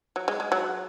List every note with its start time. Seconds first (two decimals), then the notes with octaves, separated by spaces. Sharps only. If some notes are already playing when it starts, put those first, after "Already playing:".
0.16 F#3
0.28 G#3
0.40 G#3
0.52 F#3